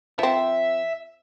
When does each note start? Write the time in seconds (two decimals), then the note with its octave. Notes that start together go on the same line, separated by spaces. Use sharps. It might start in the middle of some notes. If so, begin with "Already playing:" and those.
0.19 F3 C4 E5